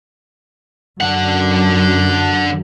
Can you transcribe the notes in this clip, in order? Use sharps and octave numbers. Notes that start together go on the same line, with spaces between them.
F#2 D3 F#5